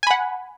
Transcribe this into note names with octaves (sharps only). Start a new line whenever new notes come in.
F#5 G#5 B5